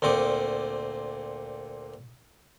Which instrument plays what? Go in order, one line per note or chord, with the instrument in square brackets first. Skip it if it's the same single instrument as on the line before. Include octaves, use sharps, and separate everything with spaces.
[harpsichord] D2 A#2 C4 D6 D#6